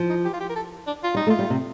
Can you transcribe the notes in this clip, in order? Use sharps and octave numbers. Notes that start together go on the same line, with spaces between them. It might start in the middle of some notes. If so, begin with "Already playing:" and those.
Already playing: F3
D#4
G4
F4
G4
A#4
A4
D4
F4
G3 D#4
A3
F4
G3
C3